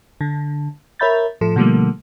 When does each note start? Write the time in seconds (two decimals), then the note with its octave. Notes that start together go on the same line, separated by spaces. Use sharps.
0.21 D3
0.99 A#4 C#5 E5 B5 G6 A6
1.41 A2 F3 A4
1.56 B2 D3 F3 G3 A3 A#3